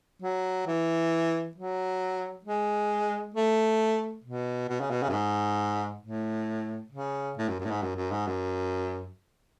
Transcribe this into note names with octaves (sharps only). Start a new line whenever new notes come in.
F#3
E3
F#3
G#3
A3
B2
B2
C#3
B2
C#3
F#2
G#2
A2
C#3
A2
F#2
F#2
A2
G#2
F#2
F#2
G#2
F#2